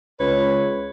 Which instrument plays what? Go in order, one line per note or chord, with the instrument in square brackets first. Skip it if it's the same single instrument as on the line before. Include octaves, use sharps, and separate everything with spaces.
[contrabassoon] C#2 [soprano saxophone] B4 [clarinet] C#5